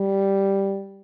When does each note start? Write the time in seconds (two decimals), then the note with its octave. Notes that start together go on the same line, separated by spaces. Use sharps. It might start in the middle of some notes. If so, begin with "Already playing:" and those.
Already playing: G3